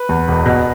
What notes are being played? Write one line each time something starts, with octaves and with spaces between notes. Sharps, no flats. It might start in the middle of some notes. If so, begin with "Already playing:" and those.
Already playing: B4
E2
E1
B2